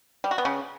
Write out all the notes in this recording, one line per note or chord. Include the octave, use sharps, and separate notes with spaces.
G3
F#4
B3
C#3